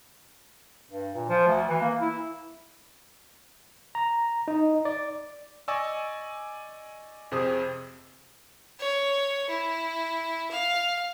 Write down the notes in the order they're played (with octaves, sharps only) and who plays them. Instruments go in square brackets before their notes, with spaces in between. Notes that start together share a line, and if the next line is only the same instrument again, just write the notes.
[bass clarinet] G2
A#2
F3
D2
E3
A#3
E4
[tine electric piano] A#5
D#4
D5
[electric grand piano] D5 D#5 G#5 C#6 E6
F2 C3 G#4 C5 D#6
[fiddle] C#5
E4
F5